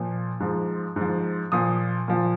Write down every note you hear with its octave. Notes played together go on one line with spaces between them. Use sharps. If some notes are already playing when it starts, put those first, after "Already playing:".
Already playing: A#2 F3
G#2 F3
G#2 F3
A#2 F3 D#6
A#2 F3